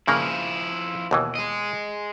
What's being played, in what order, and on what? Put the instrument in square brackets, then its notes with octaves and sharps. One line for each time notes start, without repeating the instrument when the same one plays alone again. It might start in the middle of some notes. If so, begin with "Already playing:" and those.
[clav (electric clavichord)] G2 C#3 A#3 [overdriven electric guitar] F3 E4
[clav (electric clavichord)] D#2 B2 E3
[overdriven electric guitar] G#4 D#5